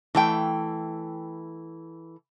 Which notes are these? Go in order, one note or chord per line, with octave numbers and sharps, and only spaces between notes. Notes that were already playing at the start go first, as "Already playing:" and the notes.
E3 A3 G5